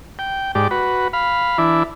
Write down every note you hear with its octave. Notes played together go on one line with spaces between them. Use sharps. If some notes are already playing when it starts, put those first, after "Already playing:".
G5
G#2 G4 D5
F#4 B4
F5 B5
E3 D4 E4